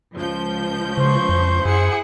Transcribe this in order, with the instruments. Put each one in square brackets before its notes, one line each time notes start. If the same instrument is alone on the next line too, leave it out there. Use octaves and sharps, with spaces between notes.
[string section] C#2 F3 G6
[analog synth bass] C#3 [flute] C5 [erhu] C#6
[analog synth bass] F2
[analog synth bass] F#2 [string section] E4 F#5 C#7 [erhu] G#4